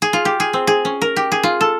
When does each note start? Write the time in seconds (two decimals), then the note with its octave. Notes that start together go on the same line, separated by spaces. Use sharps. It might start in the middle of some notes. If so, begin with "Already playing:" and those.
0.02 G#4
0.13 F4
0.25 G4
0.40 G#4
0.53 C4
0.67 G#4
0.85 C#4
1.02 A#4
1.16 G4
1.32 G#4
1.43 F4
1.61 A4